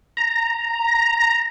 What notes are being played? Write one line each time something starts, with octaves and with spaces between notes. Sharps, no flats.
A#5